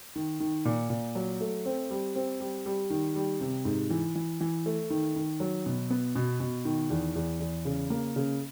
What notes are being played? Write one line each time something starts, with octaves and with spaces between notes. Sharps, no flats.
D#3
D#3
A#2
A#2
F#3
A3
C4
G3
C4
G3
G3
D#3
G3
C3
G#2
E3
E3
E3
A3
D#3
D#3
F#3
B2
B3
B2
B2
D#3
E2
E2
E2
C#3
A#3
C#3